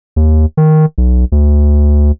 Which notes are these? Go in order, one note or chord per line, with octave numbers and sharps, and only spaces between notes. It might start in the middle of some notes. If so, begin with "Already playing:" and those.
D#2
D#3
B1
D2